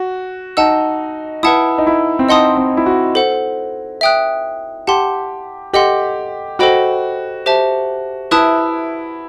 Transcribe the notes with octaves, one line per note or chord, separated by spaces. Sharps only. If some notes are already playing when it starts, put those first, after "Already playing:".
Already playing: F#4
D#4 F#5 A5 E6
E4 B4 F#5 A5 D#6
D#4
E4
C4
D#4 D#5 F#5 A5 C6 D#6
C4
E4
F#4
A4 C5 F#5
E5 G5 D#6 F#6
G4 F#5 A5 C6
G4 A4 D#5 F#5 C6
F#4 A4 C5 D#5 G5 B5
G4 C5 E5 A5
E4 B4 E5 A5 D#6 F#6